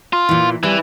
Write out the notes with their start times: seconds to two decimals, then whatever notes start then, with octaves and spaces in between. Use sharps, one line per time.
0.13 F4
0.29 A#2 E3
0.63 E3 G3 C4